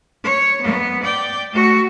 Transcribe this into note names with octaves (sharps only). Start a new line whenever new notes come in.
C#5
B3
D5 G5
A3 F#4